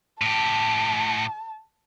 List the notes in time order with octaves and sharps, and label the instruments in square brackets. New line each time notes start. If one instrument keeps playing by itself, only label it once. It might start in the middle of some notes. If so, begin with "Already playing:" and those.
[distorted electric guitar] A2 G4 [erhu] A5